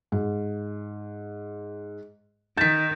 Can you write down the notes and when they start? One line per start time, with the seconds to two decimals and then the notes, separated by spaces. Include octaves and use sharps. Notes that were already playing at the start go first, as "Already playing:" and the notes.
0.12 G#2
2.57 D#3 G6 A6 B6 E7